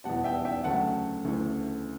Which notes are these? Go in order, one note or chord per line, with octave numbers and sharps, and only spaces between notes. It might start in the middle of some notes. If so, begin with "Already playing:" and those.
E2 B2 G3 F#5 A5
E5 G5
E5 G5
D2 C#3 F#3 A3 F#5 A5
D2 C#3 E3 A3